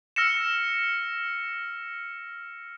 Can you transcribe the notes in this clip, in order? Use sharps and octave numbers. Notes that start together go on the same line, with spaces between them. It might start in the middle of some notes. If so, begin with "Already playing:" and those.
E6 F6 A#6 C#7 E7